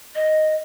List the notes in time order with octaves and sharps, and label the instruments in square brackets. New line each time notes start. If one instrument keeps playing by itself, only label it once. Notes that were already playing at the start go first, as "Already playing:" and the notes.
[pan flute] D#5